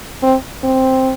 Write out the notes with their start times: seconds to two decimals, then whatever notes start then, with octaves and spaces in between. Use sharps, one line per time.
0.23 C4
0.64 C4